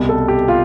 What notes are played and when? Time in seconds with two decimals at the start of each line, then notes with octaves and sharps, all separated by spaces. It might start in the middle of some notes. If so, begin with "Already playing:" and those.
Already playing: C2 B2
0.09 A4
0.28 G4
0.48 F4